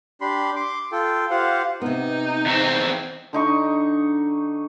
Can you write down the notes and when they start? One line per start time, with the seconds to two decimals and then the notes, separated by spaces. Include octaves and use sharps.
0.21 D4 G4 B5 C6
0.56 C6 D6
0.92 F4 A4 G5
1.31 F4 G4 C5 F5 F#5
1.82 C3 B3 D#4
2.46 E2 C4
3.33 D3 D#4 C#6